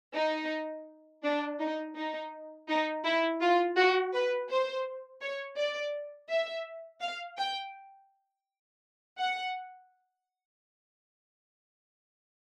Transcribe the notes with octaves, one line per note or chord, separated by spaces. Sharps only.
D#4
D4
D#4
D#4
D#4
E4
F4
F#4
B4
C5
C#5
D5
E5
F5
G5
F#5